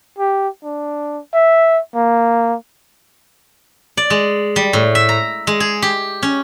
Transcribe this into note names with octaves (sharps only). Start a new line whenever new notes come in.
G4
D4
E5
A#3
D5
G#3
G3
A2
E5
A#5
G#3
G#4
G4
C#4